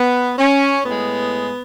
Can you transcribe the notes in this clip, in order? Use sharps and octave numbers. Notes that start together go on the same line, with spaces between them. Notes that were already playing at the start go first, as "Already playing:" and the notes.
Already playing: B3
C#4
A2 G#3 B3